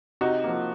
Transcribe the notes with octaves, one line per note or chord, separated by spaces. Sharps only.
C3 D#4 F#4
F3 A#3